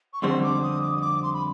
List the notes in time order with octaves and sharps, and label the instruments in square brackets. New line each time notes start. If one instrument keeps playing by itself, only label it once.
[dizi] C#6
[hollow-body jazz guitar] F2 D3 G3 C4 [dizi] C6
[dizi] D6
D#6
D6
D#6
D6
C6
B5